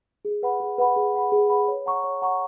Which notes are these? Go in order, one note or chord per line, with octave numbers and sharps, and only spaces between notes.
G#4
B4 F#5 B5
G#4
B4 F#5 B5
G#4
B4 F#5 B5
G#4
B4 F#5 B5
C#5
F#5 A#5 C#6
C#5
F#5 A#5 C#6